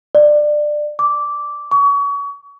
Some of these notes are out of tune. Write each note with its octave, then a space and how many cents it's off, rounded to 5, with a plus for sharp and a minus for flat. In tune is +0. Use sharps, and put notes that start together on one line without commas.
D5 +20
D6 -10
C#6 +35